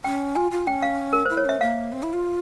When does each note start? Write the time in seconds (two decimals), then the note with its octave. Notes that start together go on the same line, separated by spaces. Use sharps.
0.04 C#4 G5
0.35 F4 G#5
0.51 F4
0.67 C#4 G5
0.82 F5
1.13 A#4
1.25 E4 C5
1.37 C#5
1.45 C#4 E5
1.61 A#3 F5
1.92 C4
2.03 E4
2.13 F4